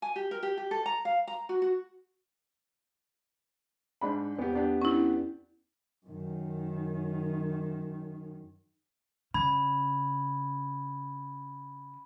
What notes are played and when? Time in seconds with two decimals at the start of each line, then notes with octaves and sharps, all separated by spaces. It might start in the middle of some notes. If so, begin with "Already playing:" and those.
0.02 G#5
0.16 G4
0.31 A#4
0.43 G4
0.57 G4
0.71 A4
0.86 A#5
1.05 F5
1.27 A#5
1.49 F#4
1.62 F#4
4.01 G#2 D4 B5
4.39 E2 B3 G4
4.54 B3 D4 G4
4.82 C#4 E4
6.06 F#2 D#3
9.34 C#3 B5 G#6